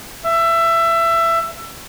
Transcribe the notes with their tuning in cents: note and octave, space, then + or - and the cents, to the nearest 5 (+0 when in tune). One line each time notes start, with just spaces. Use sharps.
E5 +20